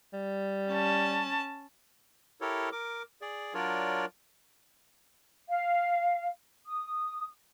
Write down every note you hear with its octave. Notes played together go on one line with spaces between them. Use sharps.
G3
C#4 A5
E4 G4 A4 A#4 C#5
A#4 D6
G#4 D5
F#3 D4 F4 A#4 C#5 D5
F5
D#6